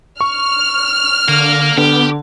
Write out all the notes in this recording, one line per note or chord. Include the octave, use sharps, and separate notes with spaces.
C#6 F6
D3 A#3
D3 B3 G4